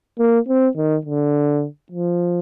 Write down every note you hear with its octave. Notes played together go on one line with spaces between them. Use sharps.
A#3
C4
D#3
D3
F3